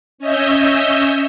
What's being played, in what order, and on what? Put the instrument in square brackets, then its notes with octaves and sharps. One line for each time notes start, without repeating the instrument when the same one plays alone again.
[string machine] C#4 C#5 D#5 E5 E6 G6